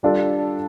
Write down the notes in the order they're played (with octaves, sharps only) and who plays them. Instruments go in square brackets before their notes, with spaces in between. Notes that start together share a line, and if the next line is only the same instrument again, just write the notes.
[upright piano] G3 D4 F4 A4